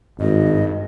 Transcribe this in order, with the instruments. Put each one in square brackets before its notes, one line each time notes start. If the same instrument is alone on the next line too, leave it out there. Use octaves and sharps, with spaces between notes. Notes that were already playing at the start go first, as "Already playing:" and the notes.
[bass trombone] G#1 [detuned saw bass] G2 [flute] D#5